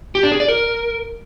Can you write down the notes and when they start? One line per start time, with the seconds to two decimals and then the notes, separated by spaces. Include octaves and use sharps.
0.15 G4
0.23 D4
0.32 G#4
0.40 D5
0.48 A#4